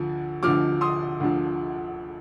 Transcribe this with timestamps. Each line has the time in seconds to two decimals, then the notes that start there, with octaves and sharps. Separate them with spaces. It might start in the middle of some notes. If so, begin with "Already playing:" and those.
Already playing: D2 D3 F3
0.43 D2 D3 F3 D6 F6
0.81 C6 D#6
1.20 D2 D3 F3